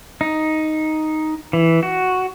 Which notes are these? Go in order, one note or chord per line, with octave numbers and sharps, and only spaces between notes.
D#4
E3
F#4